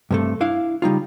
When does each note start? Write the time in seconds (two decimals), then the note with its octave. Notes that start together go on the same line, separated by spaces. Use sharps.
0.11 G2 C3 A3
0.41 D4 E4 F5
0.82 C#3 G3 D#4 F4